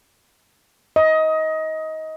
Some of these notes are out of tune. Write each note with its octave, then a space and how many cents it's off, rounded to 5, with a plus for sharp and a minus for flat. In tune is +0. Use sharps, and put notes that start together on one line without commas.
D#5 +20